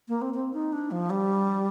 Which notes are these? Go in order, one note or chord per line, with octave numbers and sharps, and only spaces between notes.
A#3
C4
C4
D#4
D4
F3
G3